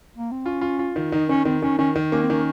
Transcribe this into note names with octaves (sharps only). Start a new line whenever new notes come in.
A#3
C4
C#4 F4
F4
F4
D#3
D#3 D#4
D#3 C#4
D#3 C4
D#3 C#4
D#3 C#4
D#3
A#3 C#4
C4
D#3 C#4